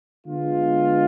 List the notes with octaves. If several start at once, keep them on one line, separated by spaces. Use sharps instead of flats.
D3 G#3 B3 F4